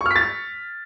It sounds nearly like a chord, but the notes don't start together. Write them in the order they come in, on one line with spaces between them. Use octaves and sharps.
C#6 F6 B6 A6